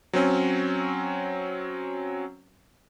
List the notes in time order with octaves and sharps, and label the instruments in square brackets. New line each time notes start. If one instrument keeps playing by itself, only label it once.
[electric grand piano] F#3 C4 C#4